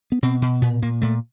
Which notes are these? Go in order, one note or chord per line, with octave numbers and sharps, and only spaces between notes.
B3
B2 C4
B2
A#2 B3
A#2 A#3
A#2 A3